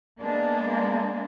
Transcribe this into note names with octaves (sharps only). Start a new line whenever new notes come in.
G#3 A#3 B3 D4